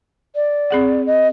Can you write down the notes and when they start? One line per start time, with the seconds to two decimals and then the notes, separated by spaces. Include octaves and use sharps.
0.35 D5
0.71 C4 G#4 F#5
1.06 D#5